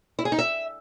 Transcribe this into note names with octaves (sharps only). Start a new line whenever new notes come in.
E4
G#4
D#4
E5